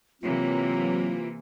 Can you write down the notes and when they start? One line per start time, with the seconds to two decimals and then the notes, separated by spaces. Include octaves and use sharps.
0.22 C3 E3 F#3 A#3 C4 F4